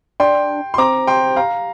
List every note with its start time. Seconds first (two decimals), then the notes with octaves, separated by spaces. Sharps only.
0.20 D4 G5 C6
0.74 C6
0.78 C4 A#5 D6
1.07 G5 C6
1.36 F5 A#5